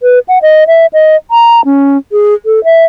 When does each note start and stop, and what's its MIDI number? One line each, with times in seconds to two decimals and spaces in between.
0.03 0.19 71
0.28 0.39 78
0.42 0.64 75
0.67 0.86 76
0.93 1.16 75
1.31 1.61 82
1.65 1.97 61
2.12 2.34 68
2.46 2.63 69
2.64 2.85 76